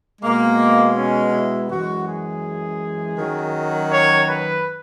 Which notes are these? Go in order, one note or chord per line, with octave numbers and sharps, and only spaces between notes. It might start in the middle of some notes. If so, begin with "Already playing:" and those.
B2 G#3 A#3
C#4
E4
F#2 E3 G#3 F#4
G#4
F#2 D#3 F#3
C#5
B4